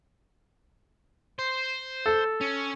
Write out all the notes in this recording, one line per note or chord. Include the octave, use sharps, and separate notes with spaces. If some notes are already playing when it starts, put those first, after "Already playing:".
C5
A4
C#4